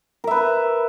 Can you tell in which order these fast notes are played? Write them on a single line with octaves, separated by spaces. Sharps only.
A#4 E5 B4